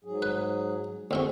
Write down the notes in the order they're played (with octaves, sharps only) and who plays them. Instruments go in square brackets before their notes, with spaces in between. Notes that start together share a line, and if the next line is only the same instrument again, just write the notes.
[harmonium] G#2 F#3 G#4
[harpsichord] B4
[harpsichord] D2 C4 C#6 [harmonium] F#4 G#4